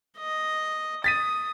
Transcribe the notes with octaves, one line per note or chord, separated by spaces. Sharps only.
D#5
D#6 A6 B6 D#7